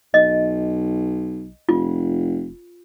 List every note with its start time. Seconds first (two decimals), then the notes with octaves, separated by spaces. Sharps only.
0.14 B1 D#5
1.69 F1 F4